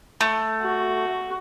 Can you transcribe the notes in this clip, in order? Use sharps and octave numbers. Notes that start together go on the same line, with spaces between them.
A3
F#4